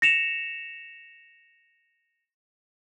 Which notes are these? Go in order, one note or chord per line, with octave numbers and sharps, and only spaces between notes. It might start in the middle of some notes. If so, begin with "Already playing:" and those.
A#6 C#7 E7 F7